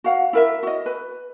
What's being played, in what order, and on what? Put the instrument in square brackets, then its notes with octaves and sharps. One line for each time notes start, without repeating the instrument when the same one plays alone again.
[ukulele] F#4 F5 F#5
E4 A#4 E5
F#4 D#5
B4